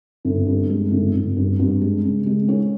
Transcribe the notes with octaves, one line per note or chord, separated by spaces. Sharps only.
G1
G2
G#3
G1
G1
G2
G2
G#3
C#3
G#3
C#4